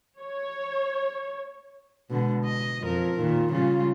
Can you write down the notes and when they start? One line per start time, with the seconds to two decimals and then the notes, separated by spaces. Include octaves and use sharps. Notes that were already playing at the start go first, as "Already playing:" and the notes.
0.20 C#5
2.10 B2 D3 G#3
2.45 D#5
2.82 F2 A#4
3.17 A#2 D#3
3.52 C#3 G3 F4